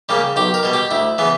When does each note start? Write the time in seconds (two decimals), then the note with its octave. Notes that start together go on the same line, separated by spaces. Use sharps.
0.09 C#3 G3 A#3
0.36 B1 G4
0.54 A#4
0.63 B2 G3
0.73 G4
0.91 D2 E4
1.18 C#3 E3 B3